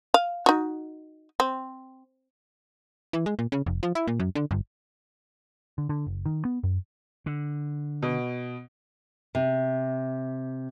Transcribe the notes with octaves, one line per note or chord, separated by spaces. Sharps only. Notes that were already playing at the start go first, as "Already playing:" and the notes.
F5
D#4 F#4
C4
E3
G#3
A#2
C#3
F1
F3
E4
A#2
F#2
D3
G1
D3
D3
F#1
D#3
B3
F#2
D3
B2
C3